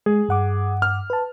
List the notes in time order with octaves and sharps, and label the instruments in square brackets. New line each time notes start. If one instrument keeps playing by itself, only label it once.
[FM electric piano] G#3 [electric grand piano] G#4
[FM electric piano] G2 F#5 D6
[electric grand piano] F6
[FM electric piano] B4 A5